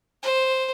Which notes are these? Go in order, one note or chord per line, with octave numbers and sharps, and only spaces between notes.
C5